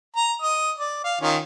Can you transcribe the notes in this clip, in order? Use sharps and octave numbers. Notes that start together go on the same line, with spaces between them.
A#5
D#5 D#6
D5
F5
D#3 C#4 F4